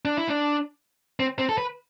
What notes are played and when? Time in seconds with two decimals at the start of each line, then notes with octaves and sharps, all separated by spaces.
0.05 D4
0.17 E4
0.28 D4
1.20 C4
1.39 C4
1.49 A4
1.58 B4